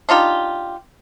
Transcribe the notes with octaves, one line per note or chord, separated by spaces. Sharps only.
D4 D#4 F4 G4